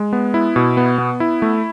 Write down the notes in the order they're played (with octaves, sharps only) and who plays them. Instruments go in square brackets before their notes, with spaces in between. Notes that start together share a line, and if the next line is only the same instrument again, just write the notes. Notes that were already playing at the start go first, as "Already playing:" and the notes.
Already playing: [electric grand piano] G#3
B3
E4
B2
B3
B3
E4
A3